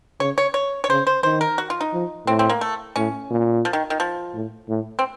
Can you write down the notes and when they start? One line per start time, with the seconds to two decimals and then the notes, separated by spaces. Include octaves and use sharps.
0.20 C#3 C#5
0.38 C#5
0.54 C#5
0.84 C#5
0.90 C#3 C5
1.07 C5
1.23 D#3 C5
1.41 A#4
1.58 F#4
1.70 F4
1.81 D#4
1.93 F3
2.27 A2 C4
2.39 C4
2.50 A#3
2.61 A3
2.96 A2 C#4
3.30 A#2
3.65 F3
3.73 D#3
3.90 D#3
4.00 F3
4.34 A2
4.69 A2
4.99 C4